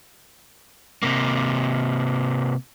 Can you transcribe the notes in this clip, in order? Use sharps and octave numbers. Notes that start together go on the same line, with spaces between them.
C3 A#3